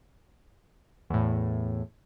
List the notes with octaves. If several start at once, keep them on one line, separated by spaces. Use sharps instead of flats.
E2 A2